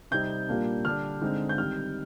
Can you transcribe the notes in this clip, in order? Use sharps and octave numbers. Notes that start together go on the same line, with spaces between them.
C3 G3 C4 D#4 G6
A#2 G3 A#3 D4
D3 G3 D4 F6
D3 G#3 C4 D#4
G6
D#3 G3 C4 D#4 F6